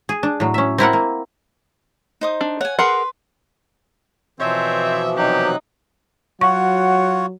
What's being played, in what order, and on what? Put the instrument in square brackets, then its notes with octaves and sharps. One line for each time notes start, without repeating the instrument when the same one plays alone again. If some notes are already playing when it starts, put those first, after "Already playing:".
[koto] G#4
D4
A2 F#3
C#4 E5
C4 E4 A#4 F#5
A#3
[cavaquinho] D#4 C5 D#6
[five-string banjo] D4
[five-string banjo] C#5 [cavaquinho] F#5 G#5
[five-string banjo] G#4 A#4 F#5 [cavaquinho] B4 C6
[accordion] B2 E3 F3 [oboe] C4 [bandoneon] C5 C#5 [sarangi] E5
[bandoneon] C3 F#3 F#6 [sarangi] D#4 [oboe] G4
[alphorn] F#3 [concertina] F4 F#4 C#5 [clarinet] F#5 [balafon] C#6